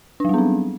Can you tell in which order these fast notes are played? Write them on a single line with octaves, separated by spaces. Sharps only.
D4 F#3 G3 B3 C4